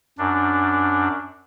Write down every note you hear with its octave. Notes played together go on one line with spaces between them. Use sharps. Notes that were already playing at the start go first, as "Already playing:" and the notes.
F#2 D4